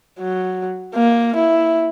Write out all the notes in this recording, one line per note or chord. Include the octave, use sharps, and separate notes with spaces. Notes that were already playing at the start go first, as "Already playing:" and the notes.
F#3
A#3
E4